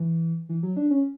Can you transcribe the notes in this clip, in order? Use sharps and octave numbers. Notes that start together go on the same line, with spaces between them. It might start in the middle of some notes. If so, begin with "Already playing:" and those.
Already playing: E3
E3
F#3
D4
C#4